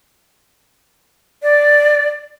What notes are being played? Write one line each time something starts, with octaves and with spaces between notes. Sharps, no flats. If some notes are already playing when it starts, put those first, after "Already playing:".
D5